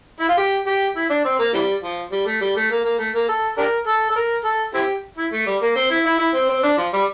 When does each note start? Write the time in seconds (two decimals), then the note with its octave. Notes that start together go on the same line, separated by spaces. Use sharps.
0.20 E4
0.29 F4
0.37 G4
0.67 G4
0.96 E4
1.10 D4
1.25 C4
1.39 A#3
1.53 C3 E3 G3
1.83 F3
2.12 G3
2.26 A3
2.41 G3
2.56 A3
2.71 A#3
2.84 A#3
2.99 A3
3.14 A#3
3.29 A4
3.58 D4 G4 A#4
3.87 A4
4.10 A4
4.16 A#4
4.44 A4
4.74 C4 E4 G4
5.17 E4
5.33 A3
5.46 G3
5.62 A#3
5.76 C4
5.90 E4
6.06 E4
6.19 E4
6.34 C4
6.49 C4
6.63 D4
6.78 F3
6.93 G3